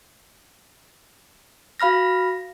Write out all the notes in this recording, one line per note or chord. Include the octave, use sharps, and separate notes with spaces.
F#4 F5 B5 F6 A#6